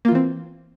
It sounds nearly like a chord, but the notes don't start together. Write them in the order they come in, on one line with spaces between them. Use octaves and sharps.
A#3 F4 E3 C4